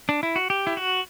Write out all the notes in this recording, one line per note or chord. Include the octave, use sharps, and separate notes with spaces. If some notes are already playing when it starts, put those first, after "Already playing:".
D4
E4
F#4
G4
E4
F#4